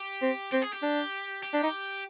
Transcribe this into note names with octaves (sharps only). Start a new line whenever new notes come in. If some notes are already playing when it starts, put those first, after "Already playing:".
Already playing: G4
C4
C4 G4
G#4
G4
D4
G4
D4
D#4